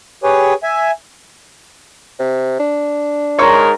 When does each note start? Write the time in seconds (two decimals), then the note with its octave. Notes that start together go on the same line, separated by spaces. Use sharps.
0.23 G4 G#4 B4 C#5
0.63 E5 G#5
2.19 C3
2.59 D4
3.39 G#2 G#3 A#4 C#5 C6 C#6